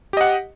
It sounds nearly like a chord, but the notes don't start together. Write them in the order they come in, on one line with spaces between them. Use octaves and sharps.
G4 D#5 F#5